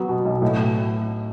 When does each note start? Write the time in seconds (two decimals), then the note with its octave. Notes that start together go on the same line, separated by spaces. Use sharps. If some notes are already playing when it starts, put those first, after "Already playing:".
Already playing: F#3 B3
0.09 B2
0.25 B1
0.42 A2